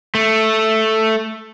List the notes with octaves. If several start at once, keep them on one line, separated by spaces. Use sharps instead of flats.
A3